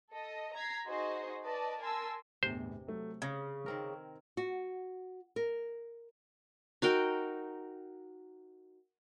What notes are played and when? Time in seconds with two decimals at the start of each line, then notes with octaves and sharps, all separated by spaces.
0.11 A4 D#5
0.54 A#5 G#6 B6 C7
0.86 D#4 F#4 G#4 C5 D#5
1.44 B4 D5 D#5 A5
1.80 A#4 G#5 A5 C6 E6
2.43 G1 E2 A2 C3 C5
2.87 F#3 A3
3.22 C#3 G#6 A#6
3.66 D#3 C4 A#4
4.37 F#4
5.36 A#4
6.82 D#4 F#4 A#4 G5